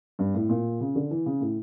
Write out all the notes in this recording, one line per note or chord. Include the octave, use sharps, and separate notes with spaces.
G2
A2
A#2
C#3
D3
E3
C#3
A2